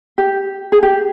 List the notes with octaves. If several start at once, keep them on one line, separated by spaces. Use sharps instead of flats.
G4
G#4
G4